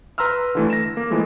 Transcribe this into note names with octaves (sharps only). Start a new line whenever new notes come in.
B4 A#5 C6 E6 F6
D3 E3 A3
A#6 E7
A#3
E3 F3 G#3 A3 A4